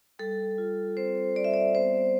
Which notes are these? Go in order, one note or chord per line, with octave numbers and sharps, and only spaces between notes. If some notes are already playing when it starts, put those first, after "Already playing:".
G3 A4
F4
C4 C5
G3 D5
E5
D5
B3 C5